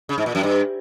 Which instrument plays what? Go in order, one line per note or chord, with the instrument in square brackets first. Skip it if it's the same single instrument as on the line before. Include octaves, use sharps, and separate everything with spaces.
[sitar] C#3
G#2
A#2
F#2
G2